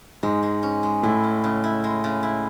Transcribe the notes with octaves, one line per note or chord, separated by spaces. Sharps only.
G#2 G#3
G#3
C#4
G#3
A2 E4
C#4
C#3
E4
G#3
C#3
E4